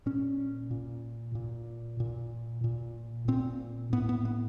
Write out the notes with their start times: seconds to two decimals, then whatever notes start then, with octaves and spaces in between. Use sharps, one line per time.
0.06 A#2 C#4
0.71 A#2
1.35 A#2
2.00 A#2
2.64 A#2
3.28 A#2 C4
3.93 A2 B3
4.09 B3
4.25 B3